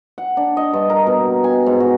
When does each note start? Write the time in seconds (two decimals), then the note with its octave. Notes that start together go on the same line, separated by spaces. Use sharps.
0.18 F#5
0.37 D4
0.57 D#5
0.73 G2
0.90 A#4
1.07 B2
1.44 G#5
1.66 G#2
1.80 F#4